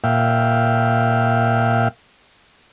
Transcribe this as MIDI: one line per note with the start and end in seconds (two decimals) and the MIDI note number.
0.04 1.88 46
0.04 1.88 76
0.04 1.88 77
0.04 1.88 79